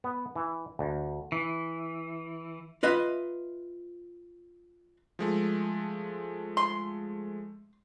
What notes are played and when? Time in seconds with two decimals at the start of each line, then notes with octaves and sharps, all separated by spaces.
0.04 B3
0.36 E3
0.79 D2
1.32 E3
2.83 F4 B4 D#5 E5
5.19 F3 G#3 A3
6.57 C6